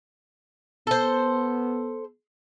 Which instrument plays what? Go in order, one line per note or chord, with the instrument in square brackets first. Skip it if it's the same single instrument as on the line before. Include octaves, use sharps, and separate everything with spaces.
[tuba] B3 [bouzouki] A4 C5